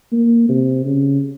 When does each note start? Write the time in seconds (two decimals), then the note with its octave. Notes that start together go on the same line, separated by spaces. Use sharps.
0.12 A#3
0.49 C3
0.85 C#3